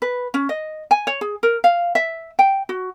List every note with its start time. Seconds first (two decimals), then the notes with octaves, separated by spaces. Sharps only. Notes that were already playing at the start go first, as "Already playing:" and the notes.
0.02 B4
0.34 C#4
0.49 D#5
0.91 G#5
1.07 C#5
1.21 G#4
1.43 A#4
1.64 F5
1.95 E5
2.39 G5
2.69 F#4